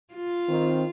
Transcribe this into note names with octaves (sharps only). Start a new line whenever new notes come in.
F4
D#3 C4